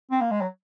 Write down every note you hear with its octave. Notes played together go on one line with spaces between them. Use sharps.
C4
A#3
G#3
F#3